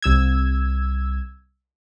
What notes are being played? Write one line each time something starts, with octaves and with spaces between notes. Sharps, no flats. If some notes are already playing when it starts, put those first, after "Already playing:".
C2 E6 G#6